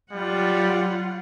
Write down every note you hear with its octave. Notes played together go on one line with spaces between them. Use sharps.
F#3 G3 F4 F#5